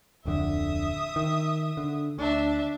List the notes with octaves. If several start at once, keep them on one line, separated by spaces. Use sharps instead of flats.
D1 F2 D3 E5 D#6
D#3
D3
D2 D4 E5